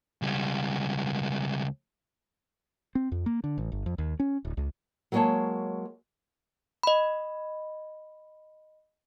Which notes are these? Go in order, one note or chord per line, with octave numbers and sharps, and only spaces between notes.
C#2 G3
C4
F2
A#3
D3
A1
G1
F2
D#2
C#4
D1
C#2
F#3 G#3 A#3 G#4 C#5 A5
D#5 B5